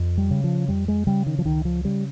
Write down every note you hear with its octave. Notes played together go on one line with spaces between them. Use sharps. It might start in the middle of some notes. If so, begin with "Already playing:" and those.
Already playing: F2
G3
C#3
F3
F2 G3
G#3
C#3 G3
D#3
F3
C#2 D#3
F3
C#3 G3